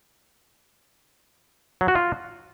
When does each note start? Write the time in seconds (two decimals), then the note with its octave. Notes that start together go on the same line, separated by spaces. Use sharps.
1.81 F#3
1.88 F#4
1.95 F4